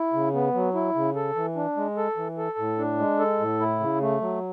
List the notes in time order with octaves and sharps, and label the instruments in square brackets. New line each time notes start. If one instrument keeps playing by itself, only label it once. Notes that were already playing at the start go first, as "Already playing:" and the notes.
Already playing: [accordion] E4
C#3
B3
F#3
E4
C#3
A4
E3
D4
G#3
A4
E3
A4
A2
D4
G#3
A4
A2
E4
C#3
A3
F#3